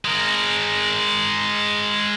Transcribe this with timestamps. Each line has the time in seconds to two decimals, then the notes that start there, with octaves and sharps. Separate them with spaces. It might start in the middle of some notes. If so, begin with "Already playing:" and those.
0.05 G#3 A#4